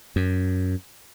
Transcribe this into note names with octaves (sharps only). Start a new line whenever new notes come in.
F#2